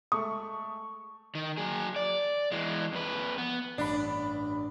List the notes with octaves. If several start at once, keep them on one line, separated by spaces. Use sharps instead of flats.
G#3 A3 A4 C#6 D#6
D#3
F#3 G#4
D5
E3 G#3
F2 B4
B3
A1 G2 D4 B5